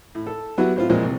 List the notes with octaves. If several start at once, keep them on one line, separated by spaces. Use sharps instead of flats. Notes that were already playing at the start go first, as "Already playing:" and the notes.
A2
A4
F#3 B3 E4 F#4 G4
A2 C4 F4
A#2 E3 F3 G#3 C4
C2